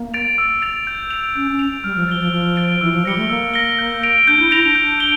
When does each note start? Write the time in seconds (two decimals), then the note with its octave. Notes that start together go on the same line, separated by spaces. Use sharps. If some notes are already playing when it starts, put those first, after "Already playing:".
Already playing: A#3
0.14 A6 D7 F7
0.38 E6
0.62 A6 D7 F7
0.87 G6
1.11 D7 F7
1.35 C#4 G6
1.51 C#4
1.59 D7 F7
1.84 G3 F6
1.96 F3
2.08 F3 A6 D7 G7
2.20 F3
2.32 F3 F6
2.56 A6 D7 G7
2.81 E3 E6
2.93 F3
3.05 G3 A#6 C#7 G7
3.17 A3
3.30 A#3 E6
3.54 A#6 C#7 G7
3.79 G6
4.03 A#6 D7 F7
4.27 D4 G6
4.39 E4
4.51 E4 A#6 D7 F7
4.64 D4
4.75 G6
5.00 D7 G7